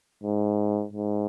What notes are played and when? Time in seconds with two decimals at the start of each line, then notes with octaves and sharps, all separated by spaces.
0.23 G#2
0.93 G#2